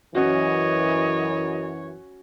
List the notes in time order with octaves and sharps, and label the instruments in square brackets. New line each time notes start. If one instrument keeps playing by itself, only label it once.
[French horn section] F#2 E3 [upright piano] C#4 F#4 [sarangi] C#5 [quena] D#5